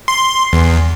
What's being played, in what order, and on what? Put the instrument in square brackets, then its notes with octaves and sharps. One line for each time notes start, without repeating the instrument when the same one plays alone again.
[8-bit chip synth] C6
E2